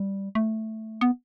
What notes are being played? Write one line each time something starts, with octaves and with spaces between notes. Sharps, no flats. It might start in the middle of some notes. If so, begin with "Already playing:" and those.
Already playing: G3
A3
B3